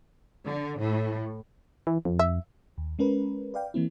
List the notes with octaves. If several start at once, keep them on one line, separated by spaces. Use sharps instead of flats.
D3
A2
E3
F2
E5
D#2
G#3 C#4 A#4 B4
B4 D5 F5 G5
E3 A#3 C4 E4